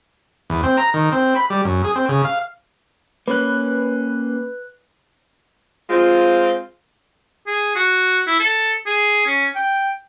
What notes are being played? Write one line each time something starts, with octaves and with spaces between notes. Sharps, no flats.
E2
C4
A#5
D#3
C4
B5
G3
F#2
G#4
C4
C#3
F5
A#3 C#4 B4 F#6
G#3 C4 F4
G#4
F#4
E4
A4
G#4
C#4
G5